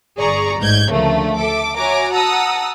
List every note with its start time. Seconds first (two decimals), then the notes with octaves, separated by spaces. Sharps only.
0.19 G1 G#4 D5 A#5 C#6
0.59 A1 G#2 G6 G#6
0.91 D2 C#3 F3 A3 A#3 D4
1.35 A4 E5 D6
1.77 F#4 C#5 E5 G#5 A#5 D6
2.12 F#5 A5 A#5 D#6 E6